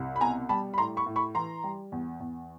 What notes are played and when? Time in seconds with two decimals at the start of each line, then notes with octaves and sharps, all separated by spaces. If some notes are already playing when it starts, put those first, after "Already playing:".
Already playing: C2
0.16 B5
0.21 B2 G#5 A#5
0.49 G3 A5 B5
0.74 B5
0.78 A2 A#5 C6
0.97 B5 C#6
1.06 A2
1.16 B5 C#6
1.35 E3 A#5 C6
1.64 G3
1.92 E2
2.20 E2